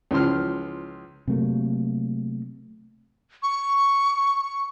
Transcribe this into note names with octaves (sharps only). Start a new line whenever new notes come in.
C#2 E3 F3 C6 F6
C3 F#3 A3 A#3
C#6